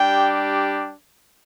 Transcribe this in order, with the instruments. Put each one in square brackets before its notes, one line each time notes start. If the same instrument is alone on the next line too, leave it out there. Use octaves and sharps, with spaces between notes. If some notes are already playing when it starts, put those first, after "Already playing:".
Already playing: [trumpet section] G3 D4 G4 G5